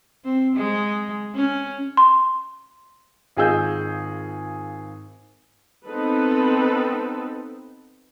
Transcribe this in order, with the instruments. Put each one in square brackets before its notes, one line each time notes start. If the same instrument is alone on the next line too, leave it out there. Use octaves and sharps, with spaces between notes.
[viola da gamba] C4
G#3
C#4
[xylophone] C6
[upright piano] G#1 F4 G#4 D#5 E6 G6
[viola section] B3 C4 D#4 A4 B4